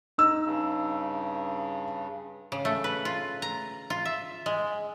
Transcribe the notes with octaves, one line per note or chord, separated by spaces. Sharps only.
D#4 E6
G2 C#3
C#3
A3
B4
F4
A#5
F4
E5
G#3